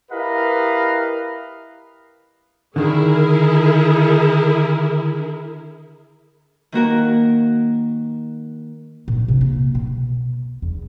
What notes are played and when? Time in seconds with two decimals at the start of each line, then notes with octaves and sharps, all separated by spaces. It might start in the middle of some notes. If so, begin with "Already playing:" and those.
0.11 E4 G4 A#4 B4 D#5 F5
2.76 D3 D#3 E4 G#4 A#4
6.72 D#3 A#3 F#4 A#4
9.08 A#2
9.28 C3
9.41 A#3
9.75 B2
10.62 E2